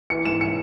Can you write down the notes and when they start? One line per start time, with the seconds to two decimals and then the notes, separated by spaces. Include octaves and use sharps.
0.10 E3 C#7
0.25 G#2 E7
0.41 C#7